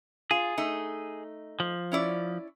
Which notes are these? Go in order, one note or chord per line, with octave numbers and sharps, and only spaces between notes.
F4 G#4
A3 D#4
F3
C#4 E4 D5